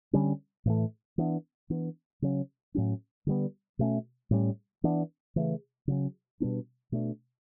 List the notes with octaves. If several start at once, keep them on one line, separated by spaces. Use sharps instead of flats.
D3 G3 C#4
A2 E3 A3
E3 B3 D4
E3 B3 D4
C#3 F#3 C#4
A2 F#3 C#4
D3 G3 B3
B2 A3 C#4
A2 G3 C#4
E3 B3 D4
C#3 E3 A3
C#3 F#3 C#4
B2 G3 B3 D4
B2 A3 D4